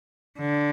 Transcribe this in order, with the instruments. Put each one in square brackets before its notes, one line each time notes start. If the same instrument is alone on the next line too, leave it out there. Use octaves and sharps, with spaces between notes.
[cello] D3